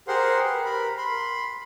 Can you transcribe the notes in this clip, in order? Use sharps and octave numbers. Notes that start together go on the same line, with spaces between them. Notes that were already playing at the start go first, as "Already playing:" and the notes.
G4 G#4 A#4 C5 F#5 C6
B4
A#4 B5
B5 C6